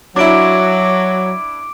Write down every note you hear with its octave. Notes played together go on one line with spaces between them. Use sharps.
F#3 D4 E4 D6 D7